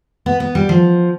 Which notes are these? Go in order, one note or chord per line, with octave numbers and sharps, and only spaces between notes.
B3
B3
G3
F3